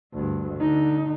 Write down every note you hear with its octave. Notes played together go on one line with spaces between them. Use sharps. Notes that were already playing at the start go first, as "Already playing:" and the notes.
D2 G2
D3 D#4